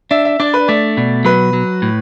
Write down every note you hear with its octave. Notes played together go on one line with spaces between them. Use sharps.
D4 E5
E5
D4 D5
B4
A3 D5
B2
F#3 B4
F#3
A2